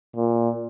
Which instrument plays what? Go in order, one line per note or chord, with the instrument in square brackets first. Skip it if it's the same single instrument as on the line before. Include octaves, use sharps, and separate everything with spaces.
[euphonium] A#2